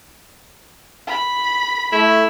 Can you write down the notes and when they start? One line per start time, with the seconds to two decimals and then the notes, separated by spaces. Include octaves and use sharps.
1.07 B5
1.92 A3 E4